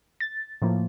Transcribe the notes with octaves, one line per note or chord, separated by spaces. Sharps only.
A6
A2 F3 A#3